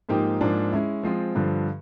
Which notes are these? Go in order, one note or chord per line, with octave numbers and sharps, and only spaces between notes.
G#2 F3 A#3 D#4 G4
G#2 F3 A#3 D4
G#3 C#4 E4
F3 G#3 C4 F4
G2 D3 F3